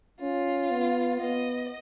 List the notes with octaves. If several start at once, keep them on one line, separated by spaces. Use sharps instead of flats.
C#4 F4
B3
B3 D#5